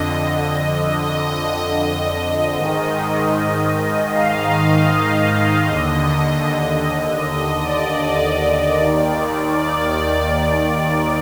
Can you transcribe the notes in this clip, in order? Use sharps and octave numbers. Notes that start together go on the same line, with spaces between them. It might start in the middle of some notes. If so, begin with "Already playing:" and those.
Already playing: F2 D3 D#5
D#5
G#2 D#3
F5
D#2 D3 D#5
D#5
D5
D#2 D#3
D5